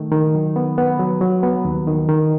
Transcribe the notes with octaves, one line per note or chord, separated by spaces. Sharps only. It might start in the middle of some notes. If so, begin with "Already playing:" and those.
Already playing: D#3 A3
D#3
F#3
B3
B3
F#3
F#3
B3
D#2
D#3
D#3